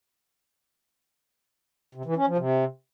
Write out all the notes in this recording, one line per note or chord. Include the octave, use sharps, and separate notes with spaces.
C3
E3
C#4
F3
C3